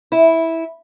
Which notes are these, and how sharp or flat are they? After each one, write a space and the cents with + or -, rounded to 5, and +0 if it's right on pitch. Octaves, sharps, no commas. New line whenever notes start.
E4 -10